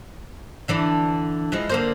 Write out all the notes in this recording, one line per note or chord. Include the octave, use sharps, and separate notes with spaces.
D3 E3 D4
E3 F3 G#3
D3 A#3 C5